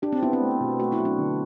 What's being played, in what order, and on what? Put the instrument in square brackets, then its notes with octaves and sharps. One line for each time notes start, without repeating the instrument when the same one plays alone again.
[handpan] D4 [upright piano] G4
[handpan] C4
[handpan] B3 [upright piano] E4
[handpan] C4
[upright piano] A3
B2
[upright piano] A3 [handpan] F#4
[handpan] E4
[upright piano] F#3
[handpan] D4
[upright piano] D3